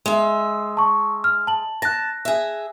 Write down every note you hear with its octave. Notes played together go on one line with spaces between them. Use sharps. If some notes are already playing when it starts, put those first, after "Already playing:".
G#3 E5
A5 C#6
F6
A5 F#7
A5 F#6 A#6
G#4 E5